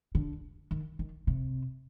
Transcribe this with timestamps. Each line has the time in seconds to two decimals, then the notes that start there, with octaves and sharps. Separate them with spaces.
0.15 D3
0.71 D#3
0.99 D#3
1.27 C3